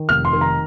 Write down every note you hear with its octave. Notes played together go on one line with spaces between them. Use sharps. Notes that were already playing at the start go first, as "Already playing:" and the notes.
Already playing: D#3
F1 F6
C6
D#3
A#5